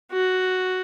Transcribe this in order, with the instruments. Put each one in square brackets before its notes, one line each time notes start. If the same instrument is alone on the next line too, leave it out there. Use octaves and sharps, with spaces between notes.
[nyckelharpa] F#4